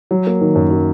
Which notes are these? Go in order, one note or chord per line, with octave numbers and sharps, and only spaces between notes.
F#3
A#3
D#3
F#2
F#3